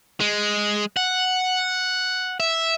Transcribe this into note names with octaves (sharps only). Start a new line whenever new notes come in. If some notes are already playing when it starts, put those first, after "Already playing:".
G#3
F#5
E5